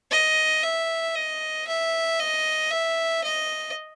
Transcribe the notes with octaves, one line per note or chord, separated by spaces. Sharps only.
D#5
E5
D#5
E5
D#5
E5
D#5